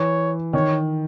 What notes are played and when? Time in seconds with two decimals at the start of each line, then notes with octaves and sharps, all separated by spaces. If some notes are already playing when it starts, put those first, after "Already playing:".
Already playing: E3 C#5
0.53 D#3 C#5